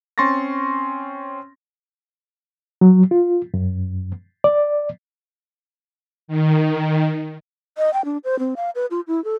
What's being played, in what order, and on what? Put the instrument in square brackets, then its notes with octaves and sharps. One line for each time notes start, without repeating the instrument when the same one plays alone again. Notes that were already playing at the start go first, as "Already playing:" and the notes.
[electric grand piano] C4 C#4 C6 C#6 A6 A#6
[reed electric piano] F#3
F4
F#2
D5
[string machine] D#3
[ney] D#5
G5
D4
C5
C4
F5
B4
F4
E4
A4